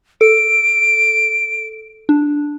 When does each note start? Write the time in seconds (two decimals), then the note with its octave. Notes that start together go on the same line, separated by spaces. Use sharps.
0.21 A4 D7
2.09 D4